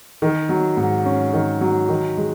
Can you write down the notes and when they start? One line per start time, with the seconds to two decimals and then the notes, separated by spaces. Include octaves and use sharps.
0.22 D#3
0.49 F#3
0.77 G#2
1.05 C#4
1.33 D#3
1.61 F#3
1.89 D#3
2.17 G#3